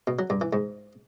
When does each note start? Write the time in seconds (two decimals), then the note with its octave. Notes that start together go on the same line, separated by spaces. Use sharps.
0.07 B2
0.19 F#3
0.30 G2
0.41 E3
0.53 G#2